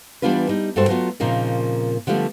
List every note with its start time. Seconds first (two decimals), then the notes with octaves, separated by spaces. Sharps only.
0.22 E3 G3 B3 D4 F4 B4
0.49 G3 D#4
0.76 G2 G3 F#4 A4 C5
0.88 F#3 A3 B3 F4 F#4
1.20 A#2 C#3 F3 A#3 C4 D#4
2.07 D3 F3 G3 A3 B3